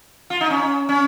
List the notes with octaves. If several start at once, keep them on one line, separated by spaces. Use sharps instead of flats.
F4
D#4
C#4
C#4